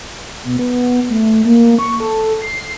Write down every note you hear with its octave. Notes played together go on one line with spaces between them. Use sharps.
B2
B3
A3
A#3
C#6
A4
C7